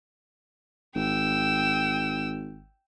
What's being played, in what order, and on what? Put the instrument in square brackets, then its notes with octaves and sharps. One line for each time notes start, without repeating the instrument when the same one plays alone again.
[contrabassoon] G#1 [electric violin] G5 E6